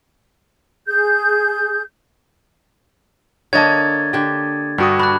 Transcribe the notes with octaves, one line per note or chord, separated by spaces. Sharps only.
G#4 G6
D3 A#3 C#5 D#5 A5 G#6 A6
D3 G4
G2 F#4 G4 D#6
D4 B5 F#6